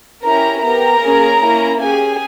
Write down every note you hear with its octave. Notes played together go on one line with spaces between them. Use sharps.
C#4 E4 G4 A#4 A#5
B3 G4 A#4 A#5
A#3 C#4 G#4
A#3 C#4 E4
C#4 G4 G#4 G#5